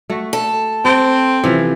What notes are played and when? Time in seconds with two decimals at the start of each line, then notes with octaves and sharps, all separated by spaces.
0.10 A3 F#4
0.33 A4
0.85 C4 G5
1.44 C3 E3 F3